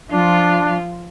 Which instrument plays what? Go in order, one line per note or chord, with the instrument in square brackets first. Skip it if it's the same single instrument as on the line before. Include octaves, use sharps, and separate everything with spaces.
[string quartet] F3 F4 [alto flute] D4